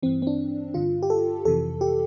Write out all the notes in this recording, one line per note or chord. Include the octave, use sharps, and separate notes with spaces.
G2 E3 C4
C4
D4
G2 D3 F4
G4
A4
F2 C3 E3 A4
G4